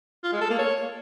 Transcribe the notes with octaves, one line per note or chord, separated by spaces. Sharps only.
F4
G#3
A4
A#3
C#5